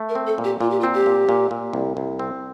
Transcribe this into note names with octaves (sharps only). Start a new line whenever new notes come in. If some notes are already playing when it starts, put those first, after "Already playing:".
Already playing: A3
A#4
C4
A4
A#2
G4
A#2 F4
G4
F4
C4
G4
A#2
A#2
A#2
C2
C2
C4